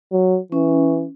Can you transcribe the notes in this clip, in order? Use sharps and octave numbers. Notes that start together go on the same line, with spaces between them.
F#3
E3 C#4